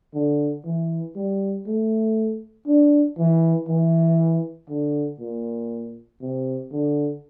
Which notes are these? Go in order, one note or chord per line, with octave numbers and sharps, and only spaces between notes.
D3
E3
G3
A3
D4
E3
E3
D3
A#2
C3
D3